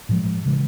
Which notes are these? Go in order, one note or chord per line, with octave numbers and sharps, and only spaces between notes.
A2 F3 G#3
C#3 E3 G#3